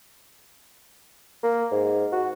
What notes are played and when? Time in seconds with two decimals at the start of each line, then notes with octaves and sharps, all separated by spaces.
1.43 A#3
1.71 G#2
2.12 F#4